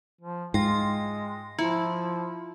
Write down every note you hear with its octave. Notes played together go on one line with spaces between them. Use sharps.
F3
G#2 G#3 F4 G5 A#6
F3 E4 F4